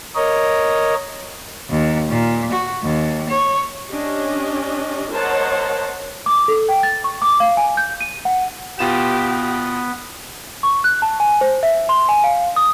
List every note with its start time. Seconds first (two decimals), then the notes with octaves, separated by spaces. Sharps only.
0.15 A#4 C#5 D#5
1.70 D#2
2.09 A#2
2.52 F#4
2.82 D#2
3.29 C#5
3.91 C#4 D4 G4 D#5
5.11 A#4 C5 C#5 D#5 F#5 A5
6.26 D6
6.48 A4
6.69 G5
6.83 A6
7.04 C#6
7.22 D6
7.40 F5
7.57 G#5
7.77 G6
8.01 D#7
8.25 F#5
8.79 B2 B3 F4 G4 E7
10.63 C#6
10.84 F#6
11.02 A5
11.20 G#5
11.41 C5
11.63 E5
11.89 C6
12.09 G#5
12.24 F5
12.56 D#6